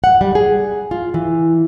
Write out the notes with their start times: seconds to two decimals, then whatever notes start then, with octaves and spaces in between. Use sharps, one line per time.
0.04 F#5
0.21 G3
0.35 G#4
0.91 F4
1.14 E3